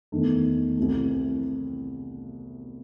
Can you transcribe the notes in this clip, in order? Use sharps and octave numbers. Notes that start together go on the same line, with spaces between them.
E2 D#3 A3
C2 C3 E3 A3